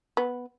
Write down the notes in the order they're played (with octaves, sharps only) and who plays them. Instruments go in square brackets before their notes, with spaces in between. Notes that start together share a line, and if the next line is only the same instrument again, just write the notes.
[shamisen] B3